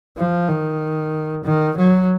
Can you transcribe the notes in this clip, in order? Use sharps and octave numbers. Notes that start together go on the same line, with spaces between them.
F3
D#3
D#3
F#3